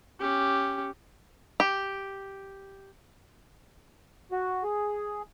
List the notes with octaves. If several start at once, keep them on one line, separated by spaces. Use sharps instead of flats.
C#4 G4
G4
F#4
G#4